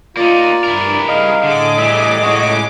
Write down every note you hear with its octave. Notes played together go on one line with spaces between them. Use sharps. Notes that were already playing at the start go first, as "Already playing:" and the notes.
A#3 D#4 F4 D5
G2 E4 A#4
G3 G#4 D#5 F5
A2 D3 G#4 D6
E3 G3 E5
G#3 C#4 F#4